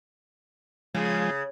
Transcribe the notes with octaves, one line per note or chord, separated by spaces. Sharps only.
C#3 F3 G#3